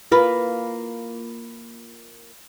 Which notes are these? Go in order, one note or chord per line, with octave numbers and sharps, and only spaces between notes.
A#3 F4 B4